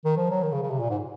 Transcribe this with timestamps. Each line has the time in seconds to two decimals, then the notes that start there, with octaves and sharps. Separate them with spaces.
0.05 D#3
0.17 F3
0.31 F#3
0.43 D#3
0.52 C#3
0.62 C#3
0.71 C3
0.80 A#2
0.90 G#2